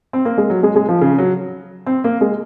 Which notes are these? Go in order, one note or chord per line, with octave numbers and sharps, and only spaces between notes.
C4
A#3
G#3
F#3
G#3
G#3
F3
C#3
F#3
C4
A#3
G#3